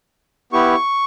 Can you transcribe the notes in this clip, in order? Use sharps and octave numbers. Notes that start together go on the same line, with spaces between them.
B3 E4 G4 C#6